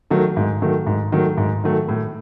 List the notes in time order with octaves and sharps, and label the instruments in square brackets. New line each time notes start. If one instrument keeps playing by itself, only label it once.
[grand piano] D#3 F#3 A3
G#2
D#3 F#3 A3
G#2
D#3 F#3 A3
G#2
D#3 F#3 A3
A2